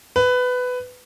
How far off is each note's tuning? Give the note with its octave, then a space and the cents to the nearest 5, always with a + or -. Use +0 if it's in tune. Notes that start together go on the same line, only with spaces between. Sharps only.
B4 +15